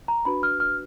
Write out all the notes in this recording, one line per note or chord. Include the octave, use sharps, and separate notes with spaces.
A#5
D4 F#4 B4 B5
F6
F6